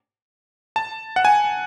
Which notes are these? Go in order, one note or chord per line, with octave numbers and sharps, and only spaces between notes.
A5
F#5
G#5